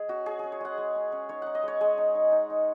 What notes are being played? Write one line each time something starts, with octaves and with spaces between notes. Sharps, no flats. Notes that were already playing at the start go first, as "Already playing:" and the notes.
Already playing: G#3 G#4
C#4 F#4
C#4 G#4
C#4 G#4
C#5
G#3 F#5
G#3
C#4
C#4
D#4 C#5
D#4 F#5
D#5
G#3 C#5
G#3 G#4
D#4
D#4
D#4
D#4